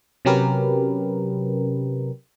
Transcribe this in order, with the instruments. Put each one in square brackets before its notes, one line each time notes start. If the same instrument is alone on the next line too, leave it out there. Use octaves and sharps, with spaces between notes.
[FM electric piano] C3 F#3 C#4 G4 A#4 B4